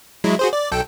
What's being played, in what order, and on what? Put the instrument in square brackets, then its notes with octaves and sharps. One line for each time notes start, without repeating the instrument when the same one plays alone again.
[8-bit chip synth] F#3 G#3 E4
F#4 G#4 C5
D5
B1 A4 G5